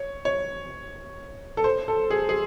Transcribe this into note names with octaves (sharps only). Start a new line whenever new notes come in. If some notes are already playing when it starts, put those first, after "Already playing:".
Already playing: C#5
C#5
A4
C5
A4
G#4
G#4